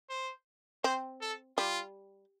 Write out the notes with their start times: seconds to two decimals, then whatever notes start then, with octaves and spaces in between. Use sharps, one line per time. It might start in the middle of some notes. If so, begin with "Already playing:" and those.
0.09 C5
0.84 C4 C5
1.21 A4
1.57 G3 F4